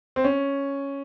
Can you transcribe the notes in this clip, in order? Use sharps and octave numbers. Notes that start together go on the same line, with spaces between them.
C4
C#4